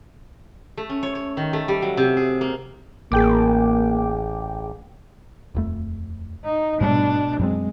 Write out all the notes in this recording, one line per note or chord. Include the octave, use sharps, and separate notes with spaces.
A3
C#4
C#5
C#5
D#3
A3
G3
F#3
C3
G#4
A#3
A1 A#3 G#4 G5 D6
D#1 F2 A3
D#4
G#2 B2 G3 A3 D4
F#2 F#3 G#3 C4